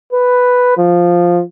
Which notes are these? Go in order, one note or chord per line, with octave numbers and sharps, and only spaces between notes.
B4
F3